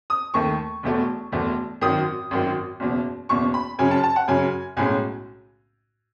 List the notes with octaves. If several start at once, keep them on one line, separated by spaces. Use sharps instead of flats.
D#6
D#2 D#3 A3 C#6
E1 E2 B2 A3
E1 E2 B2 A3
G#1 F#2 D#3 D#6
G#1 F#2 D#3
F#1 E2 B2
F#1 E2 B2 C#6
B5
F#2 C#3 F#3 G#5
A5
A5
F#5
F#2 C#3 F#3 G#5
B1 A2 G#3 C#4 G#5